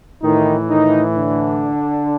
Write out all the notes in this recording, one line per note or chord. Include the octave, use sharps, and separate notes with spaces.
A2 D#3 E3 D#4
D#3 D#4
D3 D4